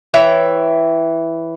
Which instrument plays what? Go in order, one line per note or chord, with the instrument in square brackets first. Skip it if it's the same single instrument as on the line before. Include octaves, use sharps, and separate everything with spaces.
[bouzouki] E3 C#5 E5 G5